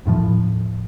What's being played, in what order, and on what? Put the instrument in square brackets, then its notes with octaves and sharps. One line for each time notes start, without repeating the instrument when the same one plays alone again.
[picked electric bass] D#1 F2 A2 F3